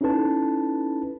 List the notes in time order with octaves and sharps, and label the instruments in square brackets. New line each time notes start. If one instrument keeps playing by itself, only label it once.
[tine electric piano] C#4 D#4 E4 A4 B4 A5